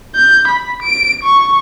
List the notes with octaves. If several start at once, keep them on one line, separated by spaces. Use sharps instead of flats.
G6
B5
D7
C#6